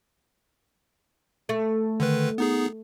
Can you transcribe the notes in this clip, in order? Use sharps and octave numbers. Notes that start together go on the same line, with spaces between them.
A3
D3 D#3 B4
B3 D#4 G#4